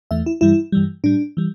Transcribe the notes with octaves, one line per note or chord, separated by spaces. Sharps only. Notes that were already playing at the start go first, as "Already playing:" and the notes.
E2 E3 A3 E5
E4
G2 E3 G3 E4
G2 E3 G3
A2 G3 D4
E3 G3